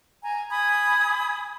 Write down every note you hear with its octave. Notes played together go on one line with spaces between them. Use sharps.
G#5 A#5
G#5 B5 D#6 G#6